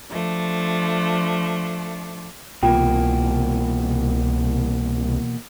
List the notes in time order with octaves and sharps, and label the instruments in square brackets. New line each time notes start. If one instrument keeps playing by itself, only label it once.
[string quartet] F3 A3 D4
[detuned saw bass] C2 [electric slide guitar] B2 E3 A#3 [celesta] F4 G5